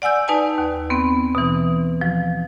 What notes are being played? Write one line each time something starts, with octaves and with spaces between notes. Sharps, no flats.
D5 F#5 G#5 E6 G6
D#4 B4 D5 G#5 A5
D#2
B3 C4
B2 E3
F3